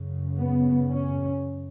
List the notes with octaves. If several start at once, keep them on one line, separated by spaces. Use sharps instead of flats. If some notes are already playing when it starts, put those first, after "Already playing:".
Already playing: F#2 C#3
B3
C#4